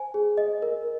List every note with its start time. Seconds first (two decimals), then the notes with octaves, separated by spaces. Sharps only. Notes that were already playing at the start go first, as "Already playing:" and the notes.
Already playing: C5 G#5
0.14 G#4
0.38 D#5
0.62 A#4